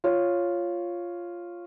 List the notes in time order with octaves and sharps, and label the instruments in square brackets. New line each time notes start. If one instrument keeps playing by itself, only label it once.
[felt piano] F4 C#5